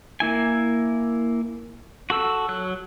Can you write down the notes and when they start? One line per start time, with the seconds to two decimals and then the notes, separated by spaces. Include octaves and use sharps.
0.20 A#3 E4 G#5
2.10 F#4 A4 E6
2.49 F#3 F#6